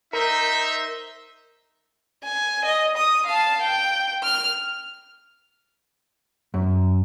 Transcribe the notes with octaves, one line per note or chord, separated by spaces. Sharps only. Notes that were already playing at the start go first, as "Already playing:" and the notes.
D#4 A#4 C5 E5
G#5
D#5
D#6
F5 A5
G5
F6
F#2